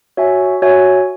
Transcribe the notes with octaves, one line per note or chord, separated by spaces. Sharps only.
F#4 C#5 E5 G#5
F#4 C#5 E5 G#5